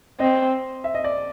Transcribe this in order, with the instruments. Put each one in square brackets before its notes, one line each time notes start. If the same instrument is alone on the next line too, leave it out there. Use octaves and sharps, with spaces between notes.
[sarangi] C4 [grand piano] D#5
[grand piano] E5
D#5
D5